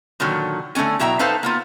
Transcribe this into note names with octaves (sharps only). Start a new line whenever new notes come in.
A#2 D3 D#3 F#3
D3 A3 A#3 C#4 G#5
B2 F#3 E4 E5 G5 A#5
D#4 A4 B4 C5 F5 A5
A#3 B3 F4